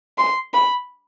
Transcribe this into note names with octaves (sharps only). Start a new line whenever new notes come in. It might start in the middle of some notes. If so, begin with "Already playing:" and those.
C6
B5